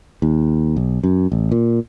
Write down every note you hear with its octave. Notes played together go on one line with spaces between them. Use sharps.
D#2
B1
F#2
A1
A#2